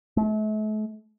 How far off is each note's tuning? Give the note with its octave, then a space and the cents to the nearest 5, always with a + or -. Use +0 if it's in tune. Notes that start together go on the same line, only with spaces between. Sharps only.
A3 -40